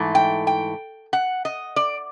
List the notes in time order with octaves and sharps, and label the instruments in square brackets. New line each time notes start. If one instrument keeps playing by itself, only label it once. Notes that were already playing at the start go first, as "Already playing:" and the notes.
Already playing: [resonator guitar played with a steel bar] G#2 E3 A3
G5
G5
F#5
D#5
D5